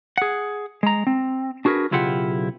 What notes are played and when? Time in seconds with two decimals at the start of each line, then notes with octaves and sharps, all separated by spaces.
0.18 G#4 F#5
0.83 G#3 A#5
1.07 C4
1.65 D4 F#4 G#4 A#4 B4
1.91 B1 C#3 E4 F4 G4 F#5